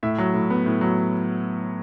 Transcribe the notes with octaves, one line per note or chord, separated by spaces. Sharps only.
A2 E5
F#3
A2
B3
A2
F#3